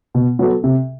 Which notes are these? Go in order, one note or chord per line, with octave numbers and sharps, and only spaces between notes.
B2
F#3 B3 F#4 A4
C3